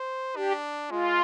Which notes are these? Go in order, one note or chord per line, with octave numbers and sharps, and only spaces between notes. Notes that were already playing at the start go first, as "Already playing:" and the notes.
Already playing: C5
D4 G4
G#3 F4